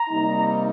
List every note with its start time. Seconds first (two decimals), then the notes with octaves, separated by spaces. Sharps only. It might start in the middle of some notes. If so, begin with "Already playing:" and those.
Already playing: A#5
0.09 C3 G3 A#3 D#4